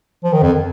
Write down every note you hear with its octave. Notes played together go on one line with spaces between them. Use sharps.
F3
D#3
F2